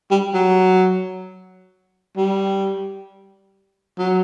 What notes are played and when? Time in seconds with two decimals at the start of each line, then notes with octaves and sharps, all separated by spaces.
0.11 G3
0.34 F#3
2.17 G3
3.99 F#3